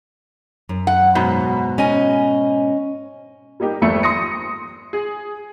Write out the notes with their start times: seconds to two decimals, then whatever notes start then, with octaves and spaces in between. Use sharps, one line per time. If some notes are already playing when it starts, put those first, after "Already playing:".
0.69 F#2
0.87 F#5
1.15 G#2 B2
1.78 C#4 D#5 G#5
3.60 G3 A#3 D#4 G4
3.82 G#1 F2 F3 A3 E5 C#7
4.03 C6 D#6 A#6 C#7
4.93 G#4